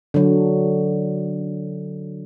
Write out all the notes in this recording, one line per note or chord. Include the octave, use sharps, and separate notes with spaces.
D3 F#3